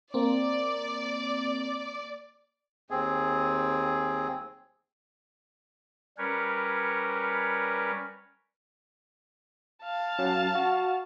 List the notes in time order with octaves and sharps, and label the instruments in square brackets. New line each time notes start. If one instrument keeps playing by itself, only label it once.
[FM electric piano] A#3 C4 [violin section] D5
[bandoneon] D#2 C4 G#4
[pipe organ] G3 C#4 A#4 B4 C#5
[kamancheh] F5 A5
[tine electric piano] F#3 C#4
F#4